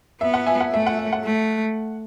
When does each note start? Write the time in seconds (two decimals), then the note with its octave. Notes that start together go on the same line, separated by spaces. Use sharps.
0.21 B3 E5
0.34 F#5
0.46 E5 G#5
0.60 F#5
0.73 A3 E5
0.87 F#5
0.99 E5
1.13 F#5
1.24 A3